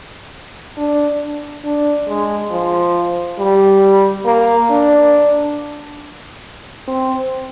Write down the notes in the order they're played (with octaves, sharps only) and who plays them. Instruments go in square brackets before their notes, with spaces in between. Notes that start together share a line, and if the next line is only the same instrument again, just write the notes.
[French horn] D4
D4
G#3
F3
G3
A#3
D4
C4